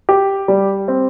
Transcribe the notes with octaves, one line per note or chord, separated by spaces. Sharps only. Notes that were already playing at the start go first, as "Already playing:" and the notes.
G4
G3
C4